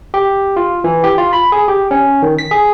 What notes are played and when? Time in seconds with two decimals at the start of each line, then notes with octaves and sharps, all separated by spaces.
0.14 G4
0.57 F4
0.84 E3
1.04 G4
1.18 F4
1.33 B5
1.52 G#4
1.68 G4
1.91 C#4
2.22 D#3
2.39 B6
2.51 G#4